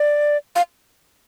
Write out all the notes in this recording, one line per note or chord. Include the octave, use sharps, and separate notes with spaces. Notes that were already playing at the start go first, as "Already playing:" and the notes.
Already playing: D5
F5